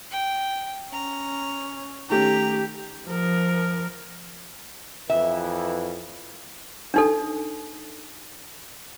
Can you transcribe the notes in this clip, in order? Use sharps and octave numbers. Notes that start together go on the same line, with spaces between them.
G5
C#4 A#5
D#3 A3 C#4 G4 A#5
F3 A#4
F2 E3 E5
D4 D#4 A4